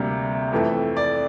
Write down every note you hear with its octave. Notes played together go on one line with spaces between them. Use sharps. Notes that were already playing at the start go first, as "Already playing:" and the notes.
Already playing: D2 C3 G3 A#3
F2 E3 A3
D5